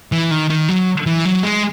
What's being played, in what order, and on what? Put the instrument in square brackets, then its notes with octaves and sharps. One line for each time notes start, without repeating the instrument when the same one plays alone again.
[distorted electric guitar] E3
D#3
D#3
F#3
E3
F#3
G#3